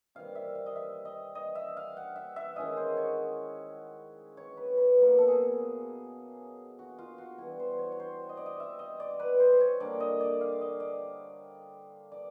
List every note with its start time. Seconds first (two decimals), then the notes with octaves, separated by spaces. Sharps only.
0.15 C3 D#3 G3 F5
0.35 E5
0.55 F5
0.66 D#5
0.76 E5
1.05 D#5
1.35 D#5
1.55 E5
1.77 F5
1.97 F#5
2.16 E5
2.36 E5
2.56 D#3 G#3 C#4 E4 D#5
2.77 C5
2.97 C#5
4.37 C#5
4.57 B4
4.77 B4
4.98 B2 F#3 A#3
5.18 A4
5.28 G#4
6.79 F#4
6.98 F4
7.18 F#4
7.38 E3 G3 B3 E4 F#4
7.60 C5
7.79 C#5
7.92 C#5
8.00 C5
8.29 D#5
8.37 D5
8.46 D#5
8.60 E5
8.79 D#5
9.00 D5
9.19 B4
9.40 C5
9.61 C#5
9.80 D3 G3 A#3 D5
10.00 D#5
10.21 D5
10.41 F5
10.61 D#5
10.80 D5
12.12 D5